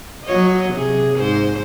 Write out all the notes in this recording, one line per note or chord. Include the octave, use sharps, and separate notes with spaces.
F#3 C#5 D#5
C3 G#4
G#2 C5